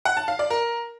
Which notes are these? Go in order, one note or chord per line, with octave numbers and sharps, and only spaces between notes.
F#5
A5
F5
D5
A#4